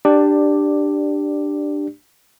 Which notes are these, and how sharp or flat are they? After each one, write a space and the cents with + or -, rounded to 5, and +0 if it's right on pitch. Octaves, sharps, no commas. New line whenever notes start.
D4 +10 G4 +0 D5 +0